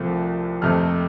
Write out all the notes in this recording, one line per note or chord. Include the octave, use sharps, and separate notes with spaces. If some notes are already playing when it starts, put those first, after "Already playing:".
Already playing: C2 C3 F3 A3
F2 C3 A3 F6